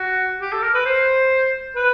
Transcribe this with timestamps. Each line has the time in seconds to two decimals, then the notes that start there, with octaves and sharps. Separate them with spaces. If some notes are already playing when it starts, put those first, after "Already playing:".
Already playing: F#4
0.41 G4
0.52 A4
0.63 A#4
0.74 B4
0.85 C5
1.76 B4